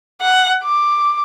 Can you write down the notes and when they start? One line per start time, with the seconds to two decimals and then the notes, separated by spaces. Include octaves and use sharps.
0.21 F#5
0.64 D6